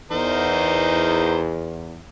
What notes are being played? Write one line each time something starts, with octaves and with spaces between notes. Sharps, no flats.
E2 D#4 A#4 C5